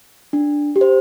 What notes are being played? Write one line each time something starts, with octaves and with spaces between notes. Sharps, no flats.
D4
G4
C5